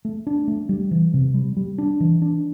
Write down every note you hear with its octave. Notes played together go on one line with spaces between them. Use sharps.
A3
D4
A3
G3
E3
C3
G3
G3
D4
E3
D4